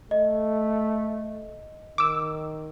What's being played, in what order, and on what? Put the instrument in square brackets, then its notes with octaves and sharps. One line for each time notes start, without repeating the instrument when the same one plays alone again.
[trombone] A3 [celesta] D#5
[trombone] D#3 [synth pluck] D6 E6